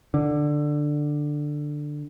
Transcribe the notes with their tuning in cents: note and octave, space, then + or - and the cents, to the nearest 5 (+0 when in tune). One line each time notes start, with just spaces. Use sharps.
D3 +10